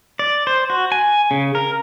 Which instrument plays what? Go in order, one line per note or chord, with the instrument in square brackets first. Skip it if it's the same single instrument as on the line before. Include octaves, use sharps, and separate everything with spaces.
[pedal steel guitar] D5
C5
F#4
G#5
C#3
A#4